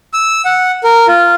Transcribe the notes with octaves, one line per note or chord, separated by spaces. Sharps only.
E6
F#5
A#4
F4